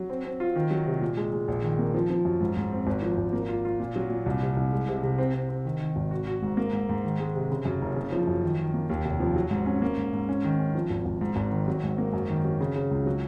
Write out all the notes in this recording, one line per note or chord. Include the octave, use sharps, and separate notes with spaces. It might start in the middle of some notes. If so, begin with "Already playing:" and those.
Already playing: F#3
C4
C4
F4
D#3
F#3
C3
A#2
G#3
G#3
A#1
D#3
A#3
F3
F3
F#2
G#2
G#2
C4
G#1
F3
G#1
A#3
F4
F4
A#2
F#3
A#2
C2
C3
C2
G#3
C3
C3
C4
C4
C4
D#3
D#3
G#1
F#4
F#4
G#2
A#3
G#2
G#2
D#3
G#3
C3
C#3
F#2
F#1
C#3
F3
F#2
D#3
D#3
A#3
D#2
F1
F3
F#3
G#2
C#4
A#3
G#2
G#2
C#4
D#3
C#4
F3
G#1
G#1
G#2
G#1
D#3
F#3
G#2
A#3
F#2
D#3
F#3
C#3
C#3
C#2
F#3